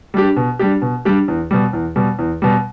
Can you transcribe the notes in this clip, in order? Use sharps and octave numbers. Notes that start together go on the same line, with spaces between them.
G3 D4 G4
B2
G3 D4 G4
B2
G3 D4 G4
E2
B2 G3
E2
B2 G3
E2
B2 G3